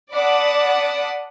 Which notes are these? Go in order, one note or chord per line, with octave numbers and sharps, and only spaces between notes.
D5 F#5 A5 B5 D6 D#6